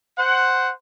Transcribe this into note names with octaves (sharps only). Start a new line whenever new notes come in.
C5 F#5